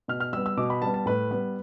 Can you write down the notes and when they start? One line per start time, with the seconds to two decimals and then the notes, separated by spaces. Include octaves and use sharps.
0.08 B2 F6
0.20 F6
0.33 G3 B3 E6
0.46 E6
0.57 B2 D6
0.70 B5
0.82 G3 B3 A5
0.94 A5
1.06 A2 B4
1.31 G3 B3